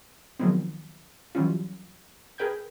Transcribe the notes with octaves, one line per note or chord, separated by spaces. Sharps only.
D#3 F3 F#3 G#3 B3 C4
E3 F#3 G3 C#4 F4
G#4 A#4 B4 G5 G6 G#6